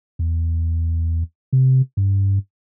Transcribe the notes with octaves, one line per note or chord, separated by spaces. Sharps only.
E2
C3
G2